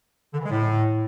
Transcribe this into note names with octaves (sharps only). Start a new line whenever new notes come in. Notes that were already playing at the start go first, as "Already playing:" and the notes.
D3
E3
G#3
A2